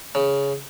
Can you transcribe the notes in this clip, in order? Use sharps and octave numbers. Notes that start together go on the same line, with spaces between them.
C#3